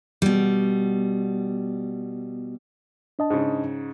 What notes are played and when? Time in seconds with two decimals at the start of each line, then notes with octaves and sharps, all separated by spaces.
0.22 B2 G3
3.19 D4 D#5 A5
3.30 G#2 C#3